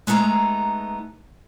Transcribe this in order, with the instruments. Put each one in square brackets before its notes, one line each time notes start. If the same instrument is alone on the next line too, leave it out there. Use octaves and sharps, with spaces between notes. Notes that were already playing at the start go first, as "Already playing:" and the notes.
[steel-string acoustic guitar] G#3 A3 B3 D#4 A#5